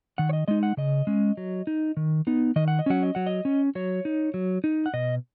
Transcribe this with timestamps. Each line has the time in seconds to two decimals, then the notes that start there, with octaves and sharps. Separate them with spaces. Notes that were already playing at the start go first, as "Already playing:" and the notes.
0.18 D#3 F#5
0.29 C#5
0.33 D#5
0.48 G#3 D#4 D#5
0.63 F#5
0.77 C#3 D#5
1.07 G#3 C#4
1.37 F#3
1.67 D#4
1.97 D#3
2.27 B3 D#4
2.56 D#3 D#5
2.68 F#5
2.79 D#5
2.86 F#3 C#4 F#5
3.03 D#5
3.15 F#3 F#5
3.27 D#5
3.45 C#4
3.75 F#3 C#5
4.05 D#4
4.34 F#3
4.64 D#4
4.86 F#5
4.94 B2 D#5